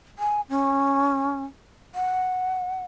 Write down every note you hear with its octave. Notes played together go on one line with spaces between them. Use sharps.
G#5
C#4
F#5